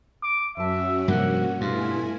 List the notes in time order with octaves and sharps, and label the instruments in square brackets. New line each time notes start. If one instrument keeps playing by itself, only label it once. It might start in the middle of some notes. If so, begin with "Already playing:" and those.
[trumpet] D6
[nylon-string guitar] F#2 A5 [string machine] C#4 F#4 [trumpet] E5
[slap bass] G2 C3 F3 [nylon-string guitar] A#3 [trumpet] F#5
[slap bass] G2 [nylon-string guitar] B2 [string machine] A3 E4 G#5 [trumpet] F4